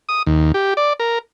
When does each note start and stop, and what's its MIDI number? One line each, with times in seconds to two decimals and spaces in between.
0.09 0.23 87
0.26 0.52 39
0.54 0.74 67
0.77 0.93 74
1.00 1.19 70